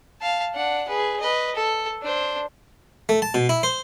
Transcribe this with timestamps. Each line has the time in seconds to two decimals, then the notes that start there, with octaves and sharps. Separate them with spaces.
0.21 F5 A5
0.54 D4 F#5
0.88 G#4 B4
1.20 B4 D#5
1.55 A4
2.02 D4 C5
3.09 A3
3.22 A5
3.34 B2
3.49 E4
3.63 C5